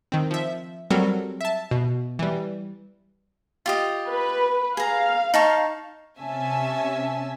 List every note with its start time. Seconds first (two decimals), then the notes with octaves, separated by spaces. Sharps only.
0.12 D#3 C4
0.31 F3 E5
0.90 F#3 G3 C4 F#4 A4 A#4
1.41 E5 A5
1.71 B2
2.19 E3 G3
3.66 F4 G4 D#5
4.08 B4
4.77 G#4 F5 A#5
5.34 D#4 A5 C#6
6.20 C3 C#4 E5 G#5 A5